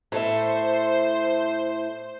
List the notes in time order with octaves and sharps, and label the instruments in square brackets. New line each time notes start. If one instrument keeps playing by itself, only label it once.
[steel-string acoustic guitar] A2 A4 E5 [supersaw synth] C5